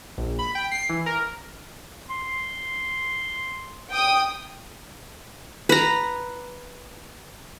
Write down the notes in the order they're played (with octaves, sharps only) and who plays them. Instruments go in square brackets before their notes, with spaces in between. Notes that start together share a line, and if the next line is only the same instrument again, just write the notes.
[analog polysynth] A#1
B5
G5
C7
E3
A#4
[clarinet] C6
[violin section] G5 D#6
[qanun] B4 A#5